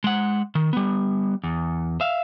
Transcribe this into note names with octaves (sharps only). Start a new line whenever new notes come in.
G#3 F#5
D#3
G3 B3
E2
E5 F5